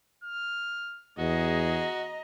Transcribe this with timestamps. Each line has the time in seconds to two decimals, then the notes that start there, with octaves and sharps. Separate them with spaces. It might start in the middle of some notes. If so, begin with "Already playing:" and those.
0.24 F6
1.19 E2 F#4 G#4 D#5 A#5